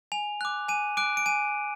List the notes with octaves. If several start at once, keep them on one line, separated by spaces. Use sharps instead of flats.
G#5 F7
D6 F#6
G#5 D#7
D6 F#6 D7
D7
G#5 D#7